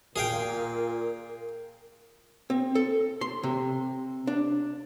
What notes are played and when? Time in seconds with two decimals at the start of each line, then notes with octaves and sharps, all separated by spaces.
0.16 A#2 G#4 A#4 F5 G5
2.50 C4
2.75 A4
3.21 C6
3.43 C3
4.27 D4